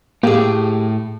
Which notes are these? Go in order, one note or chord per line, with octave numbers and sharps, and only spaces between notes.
A2 A#3 G4 G#4